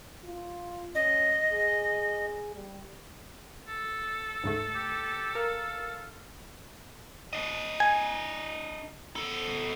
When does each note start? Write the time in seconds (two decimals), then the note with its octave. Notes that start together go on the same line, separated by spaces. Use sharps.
0.25 F4
0.95 C#4 D#5
1.53 G#4
2.55 G3
3.68 A4
4.44 D2 G#2 A3
4.75 G4
5.35 A#4 F5
7.33 D4 D#5
7.80 G#5
9.16 B3 A4